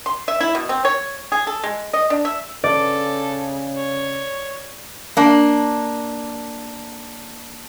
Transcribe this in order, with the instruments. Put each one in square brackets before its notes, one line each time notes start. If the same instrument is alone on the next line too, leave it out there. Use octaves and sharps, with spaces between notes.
[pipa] C6
E5
E4
B2
C4
C#5
G#4
A4
G#3
D#5
D4
E5
[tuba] C#3 [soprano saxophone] A4 [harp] D5
[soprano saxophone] C#5
[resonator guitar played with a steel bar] A#3 D4